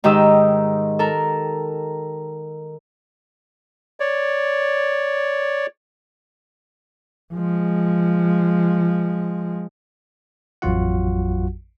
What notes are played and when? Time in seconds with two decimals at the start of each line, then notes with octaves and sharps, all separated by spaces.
0.04 G#2 D#3 G4 D#5 E6
0.99 A4 A#4
4.00 C#5 D5
7.34 F3 G#3
10.62 A1 F2 F#3 F4 F#4 F#5